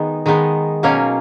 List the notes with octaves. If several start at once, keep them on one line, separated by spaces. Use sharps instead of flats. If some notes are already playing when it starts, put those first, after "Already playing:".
Already playing: D#3 G#3 B3 D#4
D#3 G#3 B3 D#4
B2 F#3 A#3 C#4 F5